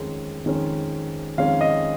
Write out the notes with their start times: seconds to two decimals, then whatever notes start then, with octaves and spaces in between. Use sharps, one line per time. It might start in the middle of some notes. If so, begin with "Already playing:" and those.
Already playing: F2 D#3 G#3 C#4
0.44 F2 D#3 G#3 C#4
1.38 F2 D#3 G#3 C#4 F5
1.61 D#5